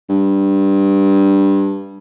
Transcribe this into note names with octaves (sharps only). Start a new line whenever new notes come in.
G2